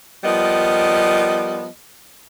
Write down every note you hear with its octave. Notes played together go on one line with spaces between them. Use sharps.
F3 G3 B3 A#4 D#5